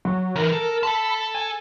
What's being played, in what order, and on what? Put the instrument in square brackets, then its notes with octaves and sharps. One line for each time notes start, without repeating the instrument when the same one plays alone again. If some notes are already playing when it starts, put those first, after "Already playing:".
[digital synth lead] F#3
[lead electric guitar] E3 D#4 [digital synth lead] A#4
[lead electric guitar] A4
[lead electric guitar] A4 A5 [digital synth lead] B5
[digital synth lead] G#5